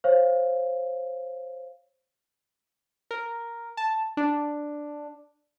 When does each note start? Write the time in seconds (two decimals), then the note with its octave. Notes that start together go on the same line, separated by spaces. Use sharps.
0.04 C5 C#5 F5
3.11 A#4
3.77 A5
4.17 D4